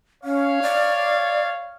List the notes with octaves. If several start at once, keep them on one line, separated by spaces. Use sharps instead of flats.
C#4 C#5 F5
D5